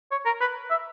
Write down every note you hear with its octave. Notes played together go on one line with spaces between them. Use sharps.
C#5
A#4
B4
E5